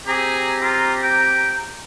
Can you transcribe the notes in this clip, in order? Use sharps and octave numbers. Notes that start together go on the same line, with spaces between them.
C4 G4 G#4 A#5
F4
G5